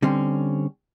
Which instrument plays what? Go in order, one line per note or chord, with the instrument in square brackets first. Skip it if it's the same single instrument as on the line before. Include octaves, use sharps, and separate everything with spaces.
[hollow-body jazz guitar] D3 G3 C4 C#4